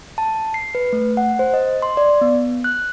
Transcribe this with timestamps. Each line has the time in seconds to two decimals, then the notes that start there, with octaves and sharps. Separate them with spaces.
0.18 A5
0.54 C7
0.75 B4
0.93 A3
1.17 F#5
1.39 C5
1.54 D#5
1.82 C6
1.97 D5
2.21 B3
2.64 F#6